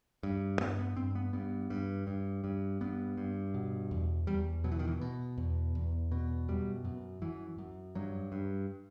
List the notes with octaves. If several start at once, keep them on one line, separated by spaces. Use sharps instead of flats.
G2
G2 B3
B3
G2 C4
B3
G2 B3
G2
G2
G2
G2 B3
G2
B2
E2
E2 G3
B2 F#3
E3
D#3
E3
B2
E2
E2
B2
F#2 G3
F#2
F#2 E3
F#2
G2 F#3
G2